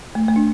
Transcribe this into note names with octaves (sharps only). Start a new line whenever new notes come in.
A3
A3
D4